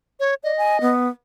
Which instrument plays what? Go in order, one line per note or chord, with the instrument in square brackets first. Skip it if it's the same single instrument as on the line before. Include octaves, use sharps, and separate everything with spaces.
[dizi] C#5
[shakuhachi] D5 [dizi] D#5
[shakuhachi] G#5
B3